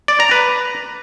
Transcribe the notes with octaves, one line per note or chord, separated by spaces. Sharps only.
D5
A#5
B4